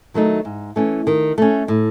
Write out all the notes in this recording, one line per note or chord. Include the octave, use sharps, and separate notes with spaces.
D#3 F#3 A3 D#4
G#2
E3 A3 C#4
D#3
A3 C#4
A2